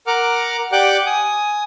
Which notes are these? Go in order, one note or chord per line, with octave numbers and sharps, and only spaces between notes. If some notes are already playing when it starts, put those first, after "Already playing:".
A#4 F#5 D6 F6
G4 D5 F#5 G5 D6 F#6
G#5 D#6